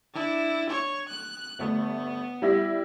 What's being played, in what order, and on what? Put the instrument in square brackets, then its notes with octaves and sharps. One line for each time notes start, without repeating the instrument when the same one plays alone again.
[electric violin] D4 E4
C#5
F#6
[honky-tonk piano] G1 A3 [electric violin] B3
[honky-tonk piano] G3 E4 A#6